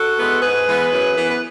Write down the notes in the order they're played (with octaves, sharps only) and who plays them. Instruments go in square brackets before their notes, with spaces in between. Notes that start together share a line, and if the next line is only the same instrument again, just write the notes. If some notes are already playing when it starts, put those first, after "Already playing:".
Already playing: [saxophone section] F#4 A4
E3 G#3 B3
G#2 G#4 B4
E3 G#3 B3
F#2
E3 B3
B4